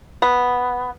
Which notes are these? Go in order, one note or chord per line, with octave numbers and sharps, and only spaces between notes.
B3